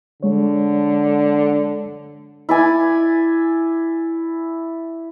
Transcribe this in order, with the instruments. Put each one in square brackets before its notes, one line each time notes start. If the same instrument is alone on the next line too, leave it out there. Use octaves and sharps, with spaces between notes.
[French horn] D3 [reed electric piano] G#3 C#5
[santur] E4 D5 G#5